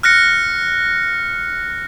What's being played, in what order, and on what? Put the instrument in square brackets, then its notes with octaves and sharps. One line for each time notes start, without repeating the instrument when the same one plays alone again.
[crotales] F6 F#6 A#6 C#7